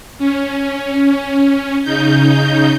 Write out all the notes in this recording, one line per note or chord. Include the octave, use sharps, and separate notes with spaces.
C#4
C#3 D#4 G6